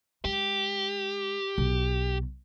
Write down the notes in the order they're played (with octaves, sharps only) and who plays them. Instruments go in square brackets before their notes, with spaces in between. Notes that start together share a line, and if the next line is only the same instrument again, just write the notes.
[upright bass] G#3 [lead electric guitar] G4
[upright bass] B1